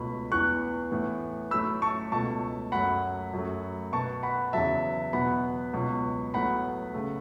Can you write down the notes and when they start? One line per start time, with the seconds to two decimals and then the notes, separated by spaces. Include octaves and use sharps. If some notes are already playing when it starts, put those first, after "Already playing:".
Already playing: C#2 B2 A3 B5
0.31 E2 E3 B3 C#6 F#6
0.92 A2 E3 B3
1.51 A2 F#3 A3 B5 E6
1.82 A5 C#6
2.12 C#2 B2 A3 A5 C#6
2.72 F#2 F#3 A3 F#5 B5
3.33 F#2 F#3 A3
3.92 B2 B3 A5 C#6
4.23 F#5 B5
4.53 E2 C#3 F#3 E5 A5
5.13 E2 B2 F#3 B3 F#5 B5
5.73 C#2 B2 F#3
6.34 A2 F#3 B3 F#5 B5
6.94 C#3 A3